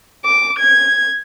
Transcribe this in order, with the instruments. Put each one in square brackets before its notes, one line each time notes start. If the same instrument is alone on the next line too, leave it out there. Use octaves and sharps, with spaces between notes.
[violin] D6
G#6